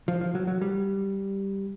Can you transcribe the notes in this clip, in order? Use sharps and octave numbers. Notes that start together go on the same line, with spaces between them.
F3
F3
F#3
F#3
G3